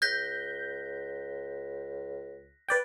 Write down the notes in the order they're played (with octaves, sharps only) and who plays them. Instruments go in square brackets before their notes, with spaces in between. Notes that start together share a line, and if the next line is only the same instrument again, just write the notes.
[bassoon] C#2 [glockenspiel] F#6 A#6 B6 [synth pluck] G6
[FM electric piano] B4 D5 G5